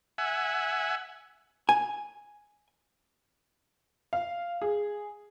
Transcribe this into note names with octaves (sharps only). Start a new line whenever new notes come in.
E5 F#5 G#5
G#5
F5
G#4